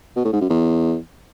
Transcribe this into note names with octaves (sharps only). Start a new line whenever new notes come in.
B2
A2
G#2
F#2
E2